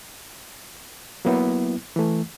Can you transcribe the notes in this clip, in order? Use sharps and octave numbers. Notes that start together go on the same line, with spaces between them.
F#3 A#3 B3 E4
E3 A3